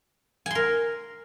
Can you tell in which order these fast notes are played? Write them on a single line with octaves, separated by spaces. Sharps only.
G#5 C6 A#4